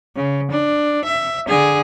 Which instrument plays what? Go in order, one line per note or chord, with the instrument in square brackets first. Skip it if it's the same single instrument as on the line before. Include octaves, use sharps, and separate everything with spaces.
[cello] C#3
D4
E5
D3 G#4